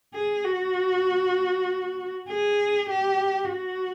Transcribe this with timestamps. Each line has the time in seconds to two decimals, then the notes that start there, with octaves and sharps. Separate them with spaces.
0.14 G#4
0.45 F#4
2.29 G#4
2.90 G4
3.51 F#4